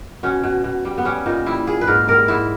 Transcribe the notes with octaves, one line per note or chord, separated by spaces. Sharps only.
B2 C#4
B2
B2
G3
B3
G3 C#4
A#2 D#4
G3 E4
A#2 G#4
B4
G#2 A#4
G3 A#4
G#2 E4